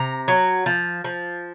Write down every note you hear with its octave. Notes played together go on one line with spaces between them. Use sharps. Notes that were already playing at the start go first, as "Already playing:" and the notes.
Already playing: C3 A#5
F#3
F3
F3